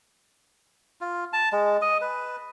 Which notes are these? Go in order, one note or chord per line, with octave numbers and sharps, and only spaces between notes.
F4
A5
G#3
D#5
B4